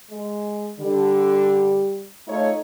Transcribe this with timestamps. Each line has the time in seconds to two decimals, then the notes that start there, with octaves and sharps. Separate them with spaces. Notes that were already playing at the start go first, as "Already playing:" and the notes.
0.10 G#3
0.80 D3 G3
2.28 A3 D#4 F4 C#5